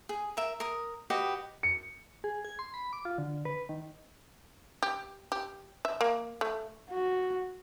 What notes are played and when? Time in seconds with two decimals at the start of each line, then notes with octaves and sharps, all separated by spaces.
0.09 G#4
0.37 A#4 E5
0.60 A#4 D#6
1.10 F#4 G4 B4 D#5
1.63 C#7
2.24 G#4
2.45 G#6
2.59 C6
2.74 B5
2.93 D6
3.05 F4
3.18 D3
3.45 B4
3.69 D#3
4.83 G4
5.32 G4
5.85 E5
6.01 A#3
6.41 A3
6.91 F#4